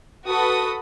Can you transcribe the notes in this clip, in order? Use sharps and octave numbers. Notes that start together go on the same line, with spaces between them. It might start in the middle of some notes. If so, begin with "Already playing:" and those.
F#4 A4 B4 D#6